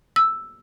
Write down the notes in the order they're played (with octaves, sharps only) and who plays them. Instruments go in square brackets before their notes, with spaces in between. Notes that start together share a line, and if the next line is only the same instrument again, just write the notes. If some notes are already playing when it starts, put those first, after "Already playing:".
[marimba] E6